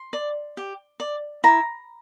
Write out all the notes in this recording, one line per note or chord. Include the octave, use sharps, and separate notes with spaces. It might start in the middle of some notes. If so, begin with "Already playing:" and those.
Already playing: C6
D5
G4
D5
E4 A#5